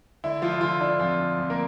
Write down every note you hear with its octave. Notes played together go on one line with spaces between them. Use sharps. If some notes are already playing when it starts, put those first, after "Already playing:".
D3 E4
D3 F3 F4
E4
D3 F3 F4
D3 D4
F2 F3 F4
D3
F2
A#3 A#4